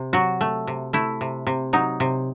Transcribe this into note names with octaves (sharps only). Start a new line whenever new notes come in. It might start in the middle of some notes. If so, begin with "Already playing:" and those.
Already playing: C3
F#3 F#4
A3
C3
A3 E4
C3
C3
F#3 D#4
C3